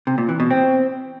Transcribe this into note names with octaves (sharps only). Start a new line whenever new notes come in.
C3
A#2
E3
B2
C4